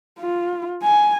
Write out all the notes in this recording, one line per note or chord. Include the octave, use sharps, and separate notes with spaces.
F4
G#5